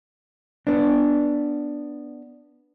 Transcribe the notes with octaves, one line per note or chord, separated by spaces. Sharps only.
B3 D4